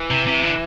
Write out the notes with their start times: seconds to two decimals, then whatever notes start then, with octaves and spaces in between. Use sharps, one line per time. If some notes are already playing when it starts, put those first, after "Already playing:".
Already playing: E3
0.10 C3
0.27 C3
0.44 D3